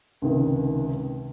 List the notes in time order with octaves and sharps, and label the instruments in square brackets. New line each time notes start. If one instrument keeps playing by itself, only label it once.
[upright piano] C#2 C3 D#3